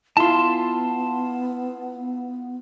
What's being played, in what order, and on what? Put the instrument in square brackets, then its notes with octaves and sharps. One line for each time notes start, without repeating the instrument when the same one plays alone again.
[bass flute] B3 [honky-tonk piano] E4 F4 [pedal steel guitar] A5 C6